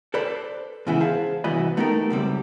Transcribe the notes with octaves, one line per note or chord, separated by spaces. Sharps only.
A4 B4 C5 D5 A5 B5
G#2 C#3 E3 B3 E4
G#4 C5 F5 A5
C2 E3 B3 F#4 D#5 B5
A3 B3 D#4 G4 A4 A#4
C#2 F#2 G3 C4